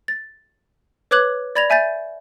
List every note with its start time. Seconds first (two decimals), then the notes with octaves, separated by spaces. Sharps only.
0.08 A6
1.11 B4 C#5 D6 F#6 G#6 F#7
1.55 D5 B5 G#6 A#6 F7
1.70 E5 G#5 G6 A6